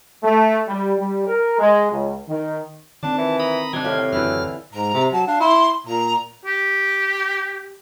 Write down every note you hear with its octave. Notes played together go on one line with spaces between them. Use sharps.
A3
G3
G3
A#4
G#3
C#2
D#3
D#3 C4 D4 A5
E3
A#5 B5 D#6
C3 D#3 D4 G5 G#6
A2 G4 F5
F#2 D3 E3 E4 F6
G#2 A#5
C3
F#3 A5
D4 F5
E4 C6
A#2 A#5
G4